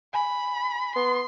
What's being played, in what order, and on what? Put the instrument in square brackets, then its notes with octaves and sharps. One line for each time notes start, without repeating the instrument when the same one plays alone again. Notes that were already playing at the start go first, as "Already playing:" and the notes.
[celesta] G#5 [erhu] B5
[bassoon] B3 [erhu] C6